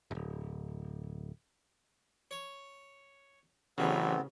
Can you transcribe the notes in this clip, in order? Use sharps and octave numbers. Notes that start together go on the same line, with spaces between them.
D1 G1
C#5
A1 E2 C#3 E3 F#3 B3 C4